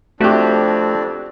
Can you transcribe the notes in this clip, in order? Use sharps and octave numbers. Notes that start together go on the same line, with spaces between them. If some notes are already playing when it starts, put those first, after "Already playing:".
F2 A3 C4 D4 F#4 G4